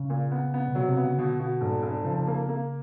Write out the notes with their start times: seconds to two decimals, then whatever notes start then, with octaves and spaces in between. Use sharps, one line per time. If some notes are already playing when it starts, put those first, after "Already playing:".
Already playing: C#3
0.10 A#2
0.31 B3
0.54 B3
0.68 B2
0.75 C3 F#3
0.89 C3
0.97 B3
1.04 C#3
1.18 B2 D3
1.40 B2
1.61 F1 G#2
1.83 F1
2.04 C#3 F3
2.27 A#3
2.49 A#3